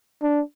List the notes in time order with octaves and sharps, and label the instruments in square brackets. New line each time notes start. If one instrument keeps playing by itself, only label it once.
[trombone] D4